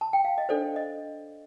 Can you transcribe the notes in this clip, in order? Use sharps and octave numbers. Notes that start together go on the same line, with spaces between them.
A5
G5
F5
D#5
D4 A4 C5 D5
D#5